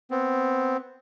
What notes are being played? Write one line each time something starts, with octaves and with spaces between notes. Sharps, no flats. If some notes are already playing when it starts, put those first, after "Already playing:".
B3 C4